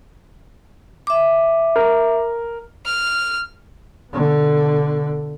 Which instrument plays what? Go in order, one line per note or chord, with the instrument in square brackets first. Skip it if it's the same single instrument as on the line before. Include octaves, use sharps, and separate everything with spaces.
[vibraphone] E5 D6
[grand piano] A#4
[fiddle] F6
[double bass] B2 D3